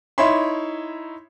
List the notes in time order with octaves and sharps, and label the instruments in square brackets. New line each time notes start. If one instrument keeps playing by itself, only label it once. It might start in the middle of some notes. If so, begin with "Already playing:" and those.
[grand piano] D#4 E4 C#5 E5 B5 C6